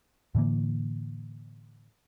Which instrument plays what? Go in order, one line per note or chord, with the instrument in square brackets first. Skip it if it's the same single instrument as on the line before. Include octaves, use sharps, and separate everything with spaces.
[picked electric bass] A2 D3 E3 A#3